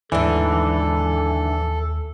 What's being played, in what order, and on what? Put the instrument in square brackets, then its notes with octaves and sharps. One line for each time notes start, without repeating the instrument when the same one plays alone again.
[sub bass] D#2 [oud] G#2 D3 [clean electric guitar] E3 [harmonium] A4